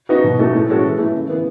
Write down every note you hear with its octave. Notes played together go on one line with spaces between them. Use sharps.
B3 D#4 F#4 B4
B2
A3 D#4 F#4 A4
A2
G#3 C#4 F#4 A4
E3
A3 E4
C#3
E3 B3